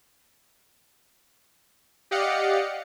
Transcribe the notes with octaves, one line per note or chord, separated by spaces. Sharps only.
G4 D5 D#5 F5 F#5 C#7